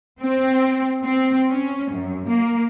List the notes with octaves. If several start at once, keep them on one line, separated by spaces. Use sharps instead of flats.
C4
C4
C#4
F#2
A#3